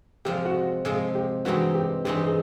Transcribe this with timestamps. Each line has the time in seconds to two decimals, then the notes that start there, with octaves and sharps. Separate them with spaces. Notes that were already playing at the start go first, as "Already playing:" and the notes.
0.25 C3 F3 G#3 G4
0.45 F#4
0.85 C3 F3 G#3 G#4
1.15 G4
1.45 G2 E3 G#3 C4 D#4 F#4
1.75 G4
2.05 G2 E3 G#3 C4 D#4 G4
2.27 G#4